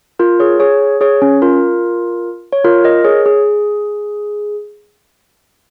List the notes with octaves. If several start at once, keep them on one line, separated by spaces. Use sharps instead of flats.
F4 A#4
G#4 C#5
G#4 C#5
G#4 C#5
C#4
F4 A#4
C#5
F4 A#4
A#4 D#5
G#4 C#5
G#4